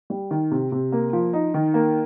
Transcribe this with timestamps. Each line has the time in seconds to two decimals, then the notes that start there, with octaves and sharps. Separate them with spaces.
0.10 G3
0.31 D#3
0.51 C3
0.72 C3
0.92 A#3
1.13 F3
1.33 D#4
1.54 D#3
1.74 A#3